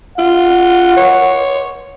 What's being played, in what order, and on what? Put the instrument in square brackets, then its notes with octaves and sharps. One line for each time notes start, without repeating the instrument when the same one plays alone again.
[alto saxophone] F4 [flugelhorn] F#5
[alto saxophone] C#5